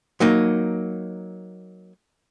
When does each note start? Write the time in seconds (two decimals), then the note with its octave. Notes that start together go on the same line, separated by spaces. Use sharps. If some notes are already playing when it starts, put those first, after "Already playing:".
0.20 F#3 A#3 D#4